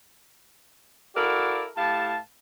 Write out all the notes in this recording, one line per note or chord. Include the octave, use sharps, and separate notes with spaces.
E4 F#4 A4 A#4 D5 F5
A2 G4 F5 A5